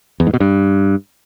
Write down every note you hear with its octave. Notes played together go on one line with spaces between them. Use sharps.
E2
G#2
B2
G2